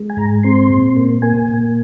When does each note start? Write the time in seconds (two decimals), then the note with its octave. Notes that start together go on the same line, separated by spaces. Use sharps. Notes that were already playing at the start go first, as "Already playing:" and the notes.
Already playing: G#3
0.10 G#5
0.17 G#2 A#5
0.43 C4 C6
0.70 A#2
0.96 A#3
1.22 A#3 G#5
1.48 A#2